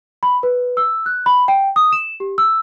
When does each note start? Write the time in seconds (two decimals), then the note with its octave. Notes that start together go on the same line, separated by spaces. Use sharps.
0.23 B5
0.43 B4
0.77 E6
1.06 F#6
1.26 B5
1.48 G5
1.76 D#6
1.92 E7
2.20 G4
2.38 E6